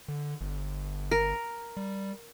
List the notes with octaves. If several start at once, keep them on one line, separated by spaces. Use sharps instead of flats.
D3
G1
A#4
G3